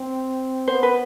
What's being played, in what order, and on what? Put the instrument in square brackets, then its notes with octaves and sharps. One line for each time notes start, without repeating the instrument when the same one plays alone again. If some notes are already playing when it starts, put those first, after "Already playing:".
Already playing: [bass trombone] C4
[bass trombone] B3 [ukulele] C5
[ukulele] B4